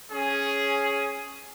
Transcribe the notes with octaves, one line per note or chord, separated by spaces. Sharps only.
C#4 G#4